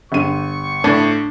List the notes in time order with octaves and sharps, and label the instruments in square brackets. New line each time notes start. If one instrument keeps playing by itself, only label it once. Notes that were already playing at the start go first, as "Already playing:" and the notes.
[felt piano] G1 D#7 [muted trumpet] C#6
[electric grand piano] A2 [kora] D4